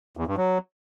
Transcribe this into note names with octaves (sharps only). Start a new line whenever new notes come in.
E2
G2
F#3